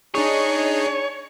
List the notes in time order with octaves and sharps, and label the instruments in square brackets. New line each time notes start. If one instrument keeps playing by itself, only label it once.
[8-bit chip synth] D4 D#4 G#4 [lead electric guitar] C#5